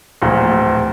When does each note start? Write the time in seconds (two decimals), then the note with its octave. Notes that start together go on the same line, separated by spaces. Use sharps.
0.22 D1 E2 A#2 F3